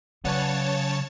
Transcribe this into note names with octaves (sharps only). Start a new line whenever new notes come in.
C#3 F#3 B4 C#5 D5 F#5 A5